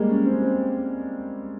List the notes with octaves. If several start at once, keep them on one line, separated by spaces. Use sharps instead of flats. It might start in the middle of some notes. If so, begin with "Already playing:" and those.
Already playing: G3 G#3 A#3
C#4
C4
C4